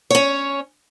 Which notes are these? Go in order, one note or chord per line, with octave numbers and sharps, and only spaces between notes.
C#4 C#5